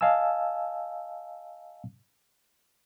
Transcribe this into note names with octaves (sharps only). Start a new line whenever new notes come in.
D#5 F5 G#5 A5 E6